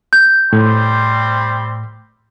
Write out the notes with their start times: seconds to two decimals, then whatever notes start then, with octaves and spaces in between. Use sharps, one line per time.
0.13 G6
0.53 A2 G3 C4 C5